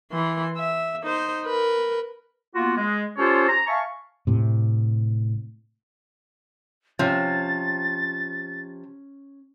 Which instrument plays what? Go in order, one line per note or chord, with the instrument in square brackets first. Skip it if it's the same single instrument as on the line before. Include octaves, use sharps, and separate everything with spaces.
[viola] E3 C6
E5
D#4 C5
A#4 B4
[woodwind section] A#3 B3 F4 F#4
G#3
C#4 F4 G4 A4 C5 C#5
A#5
E5 F5 G#5 A5 C#6
[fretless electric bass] A2 C3
[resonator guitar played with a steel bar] C3 F3 [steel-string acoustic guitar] C#4 [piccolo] A6